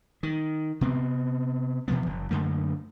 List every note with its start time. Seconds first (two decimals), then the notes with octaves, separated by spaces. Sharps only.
0.23 D#3
0.81 C3 B3 C4
1.88 B2 E3 F3 B3
2.06 F#1
2.31 F#2 D3 A3 A#3